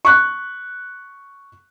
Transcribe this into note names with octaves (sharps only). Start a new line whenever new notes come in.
C#6 F#6